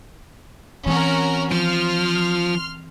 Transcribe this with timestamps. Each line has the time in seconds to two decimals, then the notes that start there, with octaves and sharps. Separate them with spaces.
0.86 E3 C4 C#4 F#4 A#4
1.52 F3 C6 F6